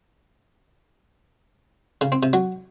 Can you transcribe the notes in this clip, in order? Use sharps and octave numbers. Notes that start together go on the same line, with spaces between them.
C#3
C4
C3
F#3